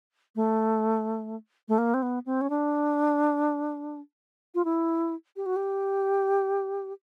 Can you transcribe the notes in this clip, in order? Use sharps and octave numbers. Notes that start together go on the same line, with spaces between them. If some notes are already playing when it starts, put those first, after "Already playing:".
A3
A3
A#3
C4
B3
C4
C#4
D4
F4
E4
G4
F#4
G4